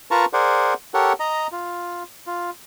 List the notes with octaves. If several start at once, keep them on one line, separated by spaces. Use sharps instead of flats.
F4 A#4 B4 A5 A#5 C#6
G#4 A#4 C5 D5 F#5
G4 A4 A#4 C#5 F#5
D#5 A#5
F4
F4